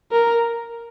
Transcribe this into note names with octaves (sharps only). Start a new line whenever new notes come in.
A#4